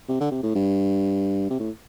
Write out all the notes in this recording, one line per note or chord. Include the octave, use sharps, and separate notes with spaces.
C3
D3
C3
A2
G2
C3
A2